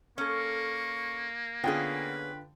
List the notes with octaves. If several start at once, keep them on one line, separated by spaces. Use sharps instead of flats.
A#3 C#4 A4 C#6
D3 B3 C#4 F4 G#4 B4 G5